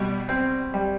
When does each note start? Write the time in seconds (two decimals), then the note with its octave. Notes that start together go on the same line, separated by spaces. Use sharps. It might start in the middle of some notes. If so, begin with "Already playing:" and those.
Already playing: B2 G3
0.29 C4
0.74 G3